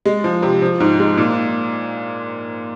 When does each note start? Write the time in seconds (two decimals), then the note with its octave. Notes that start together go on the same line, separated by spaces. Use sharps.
0.05 G#3
0.24 F3
0.43 C3
0.62 F3
0.80 G#2
0.99 G#3
1.17 A#2